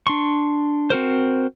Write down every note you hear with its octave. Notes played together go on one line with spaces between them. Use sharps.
D4 C6 C#6
C4 F#4 A#4 C5